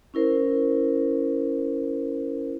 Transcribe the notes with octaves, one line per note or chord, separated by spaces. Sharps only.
C#4 E4 A#4 C5